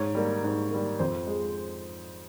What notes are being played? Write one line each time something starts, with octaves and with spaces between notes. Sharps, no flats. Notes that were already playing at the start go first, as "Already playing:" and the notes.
Already playing: G#2 C#5
G3 A#3
G#2
G3 A#3
F2 C5
G#3